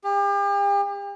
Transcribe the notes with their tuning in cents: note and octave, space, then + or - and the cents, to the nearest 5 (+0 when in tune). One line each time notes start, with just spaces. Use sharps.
G4 +40